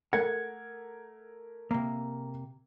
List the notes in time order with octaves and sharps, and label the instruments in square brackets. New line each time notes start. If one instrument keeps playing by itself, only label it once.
[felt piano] A3 A#4 G#6 [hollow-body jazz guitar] F#5
[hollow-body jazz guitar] C3 A#3